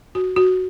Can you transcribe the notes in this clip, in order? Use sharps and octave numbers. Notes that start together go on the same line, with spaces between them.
F#4
F#4